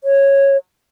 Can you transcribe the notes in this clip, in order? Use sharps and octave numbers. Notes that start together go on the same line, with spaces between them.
C#5